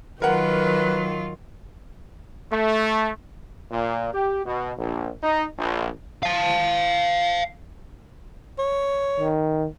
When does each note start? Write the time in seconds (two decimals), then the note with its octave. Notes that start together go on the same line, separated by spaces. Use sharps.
0.22 D#3 F#3 F4 A#4 B4 F#5
2.52 A3
3.71 A#2
4.13 G4
4.45 B2
4.77 A#1
5.23 D#4
5.58 A#1
6.23 F5 A5
8.59 C#5
9.20 D#3